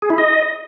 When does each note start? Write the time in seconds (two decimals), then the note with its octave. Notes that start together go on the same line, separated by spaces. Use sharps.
0.02 G#4
0.10 E4
0.18 D#5